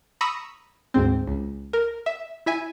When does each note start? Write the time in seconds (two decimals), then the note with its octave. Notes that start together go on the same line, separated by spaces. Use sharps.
0.21 A#5 B5 C#6 D#6 E6
0.94 D2 G#2 C4
1.27 C#2
1.73 A#4
2.06 E5
2.46 E4 E5 G#5